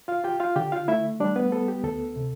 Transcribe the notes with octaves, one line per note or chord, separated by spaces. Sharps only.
F4 F5
F4 G4 G5
F4 F5
D3 G4 G5
F4 F5
A3 E4 E5
G3 D4 D5
B3 B4
B3 A4
G4
D2 A4
C3